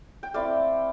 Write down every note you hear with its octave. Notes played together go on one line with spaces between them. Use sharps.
G5
A3 C4 E4 D5 F5